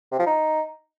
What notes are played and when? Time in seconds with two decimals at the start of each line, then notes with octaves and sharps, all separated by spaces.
0.12 C3
0.19 F3
0.27 D#4